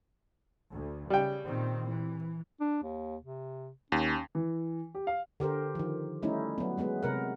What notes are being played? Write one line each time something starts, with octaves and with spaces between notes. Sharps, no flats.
D2
C#3 G3 G5
A#2 D#3 C4
E3
D4
D#2
C3
D#2 C#4
E3
G4
F5
D3 G4 A#4 C5
D#3 F3
G3 A3 C#4 D#4 E4
F#3 B3
F#3 G#3 B3 B4
C3 A#4 F#5